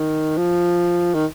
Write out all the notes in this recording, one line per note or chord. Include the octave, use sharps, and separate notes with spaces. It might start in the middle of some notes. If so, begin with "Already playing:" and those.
Already playing: D#3
F3
D#3